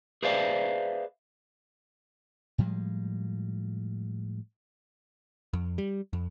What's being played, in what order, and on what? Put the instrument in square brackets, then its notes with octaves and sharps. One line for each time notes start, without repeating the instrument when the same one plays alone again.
[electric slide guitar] G#4 B4 C5 D5 E5 F5
[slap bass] A2 F3 G3 G#3
[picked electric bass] F2
G3
F2